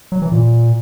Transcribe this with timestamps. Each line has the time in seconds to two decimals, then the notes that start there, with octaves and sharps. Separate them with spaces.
0.12 F#3
0.22 E3
0.32 A#2